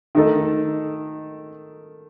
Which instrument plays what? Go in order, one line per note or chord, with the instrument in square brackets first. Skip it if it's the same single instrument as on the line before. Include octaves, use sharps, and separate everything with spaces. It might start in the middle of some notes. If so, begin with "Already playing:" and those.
[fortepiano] D#3 A3 D#4 A4